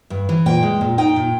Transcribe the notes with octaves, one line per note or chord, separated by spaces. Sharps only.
G2
E3
A#2 G5
G#3
A#2
D#4 G5
A#2